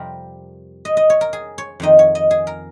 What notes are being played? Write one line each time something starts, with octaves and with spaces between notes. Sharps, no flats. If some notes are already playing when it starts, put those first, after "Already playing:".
Already playing: F2 C3 G3 C4 A#4
D#5
D#5
C#5
A#4
G#4
C#5
F2 D#3 A#3 D#4 D#5
C#5
D#5
G#4
A#4